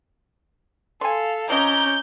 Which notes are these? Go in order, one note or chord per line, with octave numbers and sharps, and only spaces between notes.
A4 F5 G#5 C6
F3 C#4 D#5 A#5 D6 G6